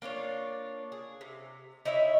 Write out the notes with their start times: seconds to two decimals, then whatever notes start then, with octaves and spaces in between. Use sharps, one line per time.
0.02 A#3 D4 F4 C#5
0.92 G#4
1.21 C3
1.85 D#4 E4 C#5 E5